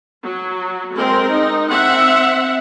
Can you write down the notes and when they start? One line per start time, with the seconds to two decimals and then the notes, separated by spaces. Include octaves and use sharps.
0.24 F#3
0.94 G#3 C4 A#4
1.28 D#4
1.68 C4 E5 F#5